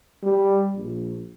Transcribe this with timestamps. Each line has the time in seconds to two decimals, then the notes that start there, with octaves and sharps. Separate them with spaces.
0.23 G3
0.76 A#1